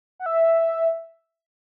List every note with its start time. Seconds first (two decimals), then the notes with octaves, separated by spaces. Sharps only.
0.20 F#5
0.26 E5